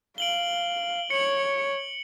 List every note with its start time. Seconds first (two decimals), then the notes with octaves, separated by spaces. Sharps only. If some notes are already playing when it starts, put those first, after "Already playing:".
0.18 F5 D7 F#7 G7
1.10 C#5 C#7 F#7